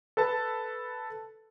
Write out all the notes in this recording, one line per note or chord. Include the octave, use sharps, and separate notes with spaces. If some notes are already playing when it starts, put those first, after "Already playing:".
A4 B4 A5